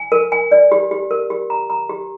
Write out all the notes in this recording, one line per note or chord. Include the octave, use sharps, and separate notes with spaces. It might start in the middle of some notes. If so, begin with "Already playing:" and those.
Already playing: G#5
A#4
G#5
D5
G4
G4
A#4
G4
A#5
A#5
G4